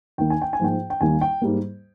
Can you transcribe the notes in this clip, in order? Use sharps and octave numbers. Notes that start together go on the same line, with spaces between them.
D#2 D#3 A#3 G5
G#5
G5
G#5
G#2 F3 A#3 G5
G5
D#2 D#3 G3 A#3 G#5
G5
G#2 G3 A#3